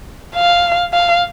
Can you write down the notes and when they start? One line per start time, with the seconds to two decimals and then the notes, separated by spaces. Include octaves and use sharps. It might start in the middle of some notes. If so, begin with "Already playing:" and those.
0.36 F5
0.93 F5